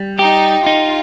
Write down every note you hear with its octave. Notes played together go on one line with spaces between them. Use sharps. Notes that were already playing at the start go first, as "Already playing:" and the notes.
Already playing: G3
D#4 G4
D#4 F4